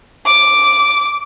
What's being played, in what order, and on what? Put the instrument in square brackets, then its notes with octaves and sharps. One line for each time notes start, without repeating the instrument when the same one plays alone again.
[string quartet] D6